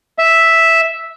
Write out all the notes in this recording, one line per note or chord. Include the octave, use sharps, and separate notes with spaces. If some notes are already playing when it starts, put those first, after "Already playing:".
E5